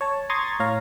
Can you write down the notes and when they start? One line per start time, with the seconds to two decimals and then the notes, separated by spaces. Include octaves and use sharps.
0.01 C#5 A5
0.30 A#5 C6 C#6 D#6 G#6 A6
0.60 A2 C#5 F5 A#5